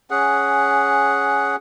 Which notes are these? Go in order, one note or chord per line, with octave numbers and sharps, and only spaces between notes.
C#4 G#4 F#5